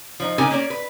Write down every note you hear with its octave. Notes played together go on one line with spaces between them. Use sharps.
F3 D#4
C#3 D#4 G4 A#4 G#5
A#3 C#4 D5
B4